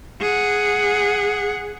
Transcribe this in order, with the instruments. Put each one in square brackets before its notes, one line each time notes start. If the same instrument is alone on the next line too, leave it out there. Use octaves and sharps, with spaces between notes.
[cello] G#4 F#5